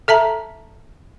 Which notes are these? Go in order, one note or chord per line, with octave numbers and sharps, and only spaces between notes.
A4 E5 A5 A#5